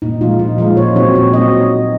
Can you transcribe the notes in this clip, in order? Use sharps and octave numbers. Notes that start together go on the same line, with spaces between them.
A#2 D#4
F3 G#3 D#4 F4
A#2 D#4
F3 G#3 D#4 F4
A#2 C#5
F#3 C4 D#4 C#5
A#2 C#5
F#3 C4 D#4 D#5